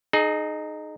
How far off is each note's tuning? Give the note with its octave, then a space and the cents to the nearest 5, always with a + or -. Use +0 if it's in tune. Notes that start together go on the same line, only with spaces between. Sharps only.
D#4 -15 G#4 +30